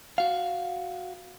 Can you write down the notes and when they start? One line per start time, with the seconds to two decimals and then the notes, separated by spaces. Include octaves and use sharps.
0.18 F#4 F5